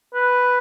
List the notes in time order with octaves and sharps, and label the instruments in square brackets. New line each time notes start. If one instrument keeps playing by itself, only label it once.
[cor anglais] B4